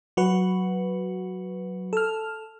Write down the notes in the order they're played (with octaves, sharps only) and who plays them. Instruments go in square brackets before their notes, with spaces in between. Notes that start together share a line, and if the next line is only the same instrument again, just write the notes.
[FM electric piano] F#3 F#4 B4
A4 F6